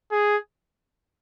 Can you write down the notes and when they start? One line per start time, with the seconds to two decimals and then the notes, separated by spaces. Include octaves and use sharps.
0.11 G#4